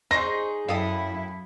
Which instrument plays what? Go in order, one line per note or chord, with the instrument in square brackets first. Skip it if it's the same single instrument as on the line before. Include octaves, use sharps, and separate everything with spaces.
[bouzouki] D#4 G#4 [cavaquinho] C5 C#6 [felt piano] A#6
[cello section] F#2 E4 [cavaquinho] A4 D#6 [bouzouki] F5 G5